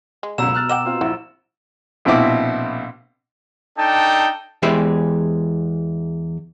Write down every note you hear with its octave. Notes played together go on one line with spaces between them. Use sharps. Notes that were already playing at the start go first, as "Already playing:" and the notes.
G#3
F#1 C#2 B2 D3 A#5 E6 E7
F6 F#6 A6
D#5 F#5 G5 D6 E7
C4 F4
A#1 E4 F#4
A#1 B2 C4 E4 D6
D4 D#4 A4 G5 A5
E2 E3 G#3 G4 C5 E5